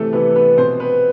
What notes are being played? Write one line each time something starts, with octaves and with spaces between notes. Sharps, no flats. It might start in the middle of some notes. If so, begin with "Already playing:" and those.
Already playing: C3 E3 A3 A4
C3 E3 B3 B4
B3 B4
B2 C4 C5
B3 B4